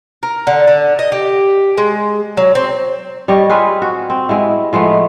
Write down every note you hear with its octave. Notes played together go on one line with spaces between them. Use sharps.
A#4
D3
D3
D#5
G4
G#3
F#3
C4
G3 G4 C#5 D#5
C4 F4 G#4 B4
F#4
C4
G#3 B3 E4
F3 G#3 A3 B3